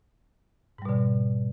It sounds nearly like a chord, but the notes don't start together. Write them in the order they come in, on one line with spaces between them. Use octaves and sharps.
G#2 G3 B2 D3